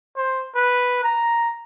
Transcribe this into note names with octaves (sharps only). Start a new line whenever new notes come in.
C5
B4
A#5